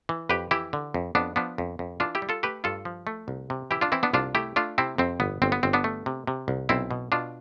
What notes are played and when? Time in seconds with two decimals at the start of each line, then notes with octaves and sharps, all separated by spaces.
0.09 E3
0.29 F2 G4 B4
0.51 E3 E4 G4
0.73 D3
0.94 F2
1.15 F2 B3 D4
1.36 F3 B3 D4
1.58 F2
1.79 F2
2.00 E3 D4 F4
2.15 E4 G4
2.22 G3
2.29 F4 A4
2.43 A3 G4 B4
2.64 G2 F4 A4
2.85 F3
3.07 A3
3.28 C2
3.50 C3
3.71 E3 E4 G4
3.81 D4 F4
3.92 E3 C4 E4
4.03 B3 D4
4.13 C2 D4 F4
4.35 A3 E4 G4
4.56 A3 D4 F4
4.78 C3 C4 E4
4.98 F2 C4
5.20 G1 B3
5.42 G1 C4
5.52 B3
5.63 G1 C4
5.73 B3 D4
5.84 A3
6.06 C3
6.27 C3
6.48 C2
6.69 B1 C4 E4
6.91 B2
7.12 B2 D4 F4